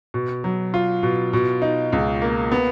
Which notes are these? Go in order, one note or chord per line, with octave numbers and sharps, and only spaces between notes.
B2
F#3
F4
B2
B2
D#4
C#2
A#3
B3